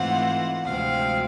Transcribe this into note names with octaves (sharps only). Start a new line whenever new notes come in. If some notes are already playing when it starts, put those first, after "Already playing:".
Already playing: G#2 E3 A3 C4 F4 F#5
D2 C3 F3 G#3 C4 F5